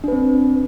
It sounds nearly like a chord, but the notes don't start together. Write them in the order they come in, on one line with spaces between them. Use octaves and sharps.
D4 B4 C4